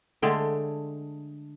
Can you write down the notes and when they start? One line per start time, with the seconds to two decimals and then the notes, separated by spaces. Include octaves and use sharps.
0.22 D3 G#3 A3 G5